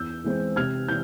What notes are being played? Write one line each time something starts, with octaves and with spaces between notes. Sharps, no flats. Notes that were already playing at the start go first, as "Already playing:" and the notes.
Already playing: E2 E6 G6
E3 G#3 C4
C3 F6 G#6
E3 G6